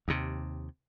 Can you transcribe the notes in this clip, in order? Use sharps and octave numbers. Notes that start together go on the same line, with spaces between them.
D#2 C3